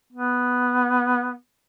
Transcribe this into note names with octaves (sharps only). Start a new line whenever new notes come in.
B3